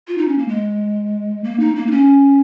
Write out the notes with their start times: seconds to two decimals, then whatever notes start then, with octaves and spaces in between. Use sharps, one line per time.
0.08 F4
0.18 D#4
0.28 C#4
0.38 A#3
0.48 G#3
1.44 A#3
1.60 D#4
1.76 A#3
1.87 D#4
1.91 C#4